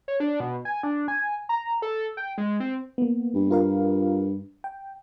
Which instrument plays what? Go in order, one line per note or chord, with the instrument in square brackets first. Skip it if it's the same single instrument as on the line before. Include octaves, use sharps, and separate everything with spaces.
[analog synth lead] C#5
D4
B2
G#5
D4
G#5
A#5
A4
G5
G#3
C4
[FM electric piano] A#3 B3
[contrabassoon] G2
[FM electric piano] F4 A#4 F5
G5